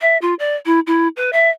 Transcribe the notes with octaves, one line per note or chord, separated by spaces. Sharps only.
E5
F4
D5
E4
E4
B4
E5